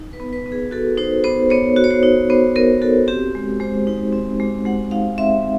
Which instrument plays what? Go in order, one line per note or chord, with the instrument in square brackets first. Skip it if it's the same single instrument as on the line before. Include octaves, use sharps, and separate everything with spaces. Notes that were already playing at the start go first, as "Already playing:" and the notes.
Already playing: [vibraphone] D#4
B4
B3
B4
B3
G#4
F#4 A4
D#4 C5
B3 C5
B3 C#5
F#4
C#5
C5
D#4
B3 C5
B3 A#4
F#4 A4
C4 G4
G#3
G#3 C5
D#4
C4
G#3
G#3 F#5
D#4 F5
C4 E5